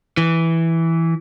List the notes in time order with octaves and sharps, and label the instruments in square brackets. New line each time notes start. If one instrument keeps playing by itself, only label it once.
[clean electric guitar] E3